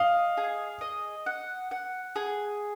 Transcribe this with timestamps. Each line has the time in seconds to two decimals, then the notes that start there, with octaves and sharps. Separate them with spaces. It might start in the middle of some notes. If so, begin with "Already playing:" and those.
Already playing: D#5 F5
0.37 G#4
0.81 D#5
1.26 F#5
1.71 F#5
2.16 G#4